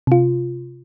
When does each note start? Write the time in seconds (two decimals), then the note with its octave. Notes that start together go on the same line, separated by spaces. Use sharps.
0.07 C3 F4